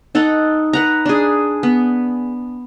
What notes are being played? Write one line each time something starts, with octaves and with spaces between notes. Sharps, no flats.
D#4 A4 F#5
B4 F#5 A#5
D4 G#4
B3